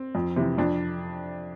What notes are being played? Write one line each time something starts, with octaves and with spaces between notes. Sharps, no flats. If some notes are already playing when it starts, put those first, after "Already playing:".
Already playing: C4
F2
C3 E3
F2 D4